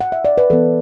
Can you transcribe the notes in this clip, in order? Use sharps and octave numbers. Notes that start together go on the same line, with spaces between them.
F#5
E5
D5
B4
E3 B3 A4